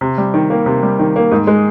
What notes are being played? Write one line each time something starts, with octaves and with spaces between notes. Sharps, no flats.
C3
G3
D#3
A#3
C3
G3
D#3
A#3
G#2
G#3